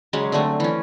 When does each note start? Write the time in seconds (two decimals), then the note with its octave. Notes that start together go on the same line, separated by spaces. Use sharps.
0.13 C#3 F#3 G#3 C#4
0.32 D3 F#3 A3 C4
0.60 E3 C#4